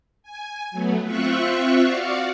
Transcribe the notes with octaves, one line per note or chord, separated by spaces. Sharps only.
G#5
F#3 A3 B3
C4 F4 E5 C#6 F#6
F#4 D5 F5 F#5